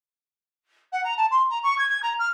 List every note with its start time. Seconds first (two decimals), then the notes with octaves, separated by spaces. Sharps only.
0.92 F#5
1.03 A#5
1.17 A5
1.31 C6
1.49 A#5
1.63 C#6
1.78 G#6
1.89 G#6
2.02 A#5
2.19 F6